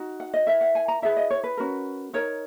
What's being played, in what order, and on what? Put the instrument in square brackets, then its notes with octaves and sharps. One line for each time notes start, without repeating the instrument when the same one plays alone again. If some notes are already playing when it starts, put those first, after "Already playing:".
Already playing: [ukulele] D#4 F#4
F#5
D#5
E4 A#4 E5
F#5
G#5
A#5
E4 G#4 B4 E5
D#5
C#5
B4
C#4 F#4 A#4
D#4 A#4 C#5